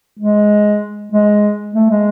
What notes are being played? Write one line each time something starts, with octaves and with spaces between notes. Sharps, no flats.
G#3
G#3
A3
G#3